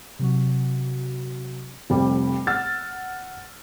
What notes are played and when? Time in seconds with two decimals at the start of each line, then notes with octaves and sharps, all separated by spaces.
0.19 C3 F#3 F#4
1.90 F1 F2 G3
2.47 F#5 E6 F6 A6